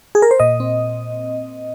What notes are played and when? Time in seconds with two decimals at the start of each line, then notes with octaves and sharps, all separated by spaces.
0.15 G#4
0.22 A#4
0.31 C5
0.40 A#2 D#5
0.60 C4